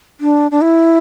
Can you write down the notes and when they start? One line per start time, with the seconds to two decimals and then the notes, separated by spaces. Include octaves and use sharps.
0.21 D4
0.51 D4
0.61 E4